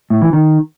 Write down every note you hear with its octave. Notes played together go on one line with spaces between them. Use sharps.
A2
E3
D#3